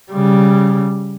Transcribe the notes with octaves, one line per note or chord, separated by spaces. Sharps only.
C#3 G3